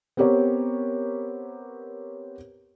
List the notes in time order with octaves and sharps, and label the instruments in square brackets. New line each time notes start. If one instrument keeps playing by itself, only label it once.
[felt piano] B3 C4 G4 A#4 C#5